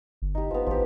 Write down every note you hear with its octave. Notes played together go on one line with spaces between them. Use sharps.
G1
D#4 G4
F3 B3
G#1 F3 G4